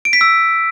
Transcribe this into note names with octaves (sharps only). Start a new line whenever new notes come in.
D7
B6
E6